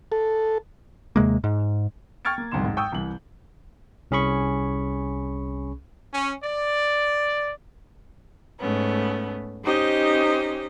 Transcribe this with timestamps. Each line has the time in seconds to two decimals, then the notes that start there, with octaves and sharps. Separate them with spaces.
0.12 A4
1.16 D#2 C3 G#3 A#3
1.44 G#2
2.25 G5 C#6 F6 G#6 A6 D7
2.38 A#3
2.51 D1 C2 F2 D#3 C6 E7
2.64 G#2
2.77 G5 C#6 D#6 E6 G6
2.92 C2 E3 F#7
4.11 C2 C#4 G#4 B5 C#6
6.14 C#4
6.44 D5
8.59 G#2 A3 B3 C#4
9.65 C#4 D#4 G4 C5 D#5